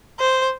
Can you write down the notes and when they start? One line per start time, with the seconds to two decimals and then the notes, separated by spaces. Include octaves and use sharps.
0.20 C5